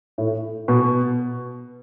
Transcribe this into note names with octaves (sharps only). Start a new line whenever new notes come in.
A2
B2